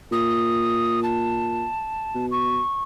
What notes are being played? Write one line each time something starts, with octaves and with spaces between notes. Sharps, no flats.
A#2 D#6
A5
B2
C#6